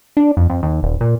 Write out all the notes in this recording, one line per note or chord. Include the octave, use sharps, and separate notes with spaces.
D4
F2
F2
D#2
D#1
A#2